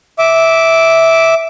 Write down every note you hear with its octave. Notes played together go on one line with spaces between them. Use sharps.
E5 D6